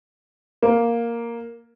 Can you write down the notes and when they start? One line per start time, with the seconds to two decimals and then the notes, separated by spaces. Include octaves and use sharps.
0.63 A#3